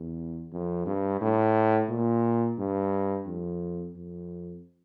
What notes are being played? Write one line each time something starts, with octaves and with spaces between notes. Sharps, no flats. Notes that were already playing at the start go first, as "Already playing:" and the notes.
Already playing: E2
F2
G2
A2
A#2
G2
F2
F2